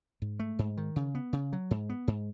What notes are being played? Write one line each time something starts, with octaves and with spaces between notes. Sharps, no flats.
G#2
A3
G#2
D#3
C#3
B3
C#3
F#3
G#2
B3
G#2